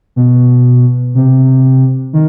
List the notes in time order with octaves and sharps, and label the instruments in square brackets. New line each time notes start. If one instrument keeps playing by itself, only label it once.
[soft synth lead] B2
C3
D#3